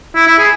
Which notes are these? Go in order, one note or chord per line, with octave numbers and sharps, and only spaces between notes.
E4
E4
G#4